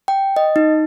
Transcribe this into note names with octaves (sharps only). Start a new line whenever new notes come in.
G5
D#5
D#4